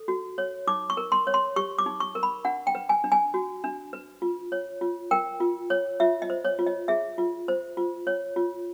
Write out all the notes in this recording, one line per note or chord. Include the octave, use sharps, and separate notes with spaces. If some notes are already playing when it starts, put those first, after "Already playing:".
Already playing: A4
F#4
C#5
D#4 D6
C#6
A#4
C6
C#5
C6
G4 C#6
D6
D#4
C#6
A#4
B5
D4 F#5
G5
B4
G#5
D4
G#5
F#4
D4
B4
F4
C#5
F4
A#4 G5
F4
C#5
F4 E5
D#5
C5
C#5
F4
D#5
G#4 E5
F4
C5
F4
C#5
F4